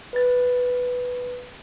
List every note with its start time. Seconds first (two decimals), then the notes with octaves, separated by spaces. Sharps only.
0.13 B4 A6